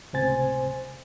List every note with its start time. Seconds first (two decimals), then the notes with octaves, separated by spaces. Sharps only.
0.13 C#2 A2 C3 C5 G#5 A6